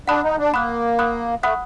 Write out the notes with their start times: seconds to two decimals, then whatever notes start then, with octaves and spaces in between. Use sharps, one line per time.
0.08 D4 F#5 B5 D#6 F#6
0.23 D#4
0.38 D4
0.53 A#3 F#5 B5 D#6 F#6
0.99 F#5 B5 D#6 F#6
1.43 A3 F#5 B5 D#6 F#6